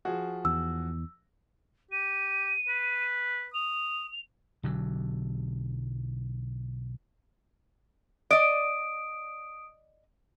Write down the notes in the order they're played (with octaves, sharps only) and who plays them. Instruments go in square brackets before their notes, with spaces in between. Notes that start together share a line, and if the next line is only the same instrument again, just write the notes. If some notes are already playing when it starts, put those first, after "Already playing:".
[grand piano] F3 F#4 G#4
[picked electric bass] E2 [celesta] E6
[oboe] G4 [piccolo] D#7
[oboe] B4
[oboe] D#6 [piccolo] F7
[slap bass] B1 D3 F#3
[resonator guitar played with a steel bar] D5 D#5 [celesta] D#6 D7